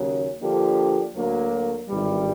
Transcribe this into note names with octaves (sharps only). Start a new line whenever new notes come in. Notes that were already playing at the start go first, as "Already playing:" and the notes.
Already playing: D#2 C#3 F#3
D3 F3 A#3 D4 G4
D2 D3 F#3 A#3
G#1 G2 E3 G3